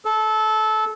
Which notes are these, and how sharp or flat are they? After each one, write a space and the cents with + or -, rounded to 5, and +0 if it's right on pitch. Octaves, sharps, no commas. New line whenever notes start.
A4 -20